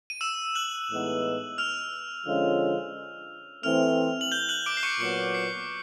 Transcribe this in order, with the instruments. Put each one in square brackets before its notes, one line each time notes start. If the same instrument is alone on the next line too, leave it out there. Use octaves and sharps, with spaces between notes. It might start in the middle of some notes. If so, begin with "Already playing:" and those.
[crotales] D#7
E6 E7
F#6 F#7
[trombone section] A2 E3 G#3 B3 D#4
[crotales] F6 F7
[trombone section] D3 F3 G#3 C#4 F4
[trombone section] E3 A3 C4 [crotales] F6 F7
[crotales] F#7
G6 G7
F#6 F#7
D6 D7
C7
C#6 C#7
[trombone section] A#2 F#3 B3 [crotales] C#6 C#7
[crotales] C7